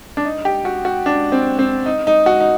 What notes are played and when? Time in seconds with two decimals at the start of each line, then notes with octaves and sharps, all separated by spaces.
0.17 D4
0.25 D#4
0.45 G4
0.65 F#4
0.85 F#4
1.06 D4
1.32 C4
1.59 C4
1.86 D#4
2.07 D#4
2.26 F#4
2.40 D#4